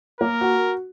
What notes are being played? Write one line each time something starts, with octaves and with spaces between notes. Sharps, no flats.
A#3 A#4
F#4